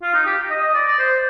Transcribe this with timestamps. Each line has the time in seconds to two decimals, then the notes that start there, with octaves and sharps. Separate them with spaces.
0.02 F4
0.14 D#4
0.26 G4
0.51 D#5
0.62 D#5
0.74 D5
0.87 D5
0.99 C5